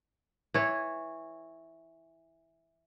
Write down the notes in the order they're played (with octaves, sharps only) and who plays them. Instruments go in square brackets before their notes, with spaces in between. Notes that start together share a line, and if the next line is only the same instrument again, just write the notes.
[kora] E3 C#5